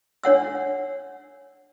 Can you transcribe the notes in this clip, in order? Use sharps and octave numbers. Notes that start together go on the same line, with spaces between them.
D4 C#5 F#5 E6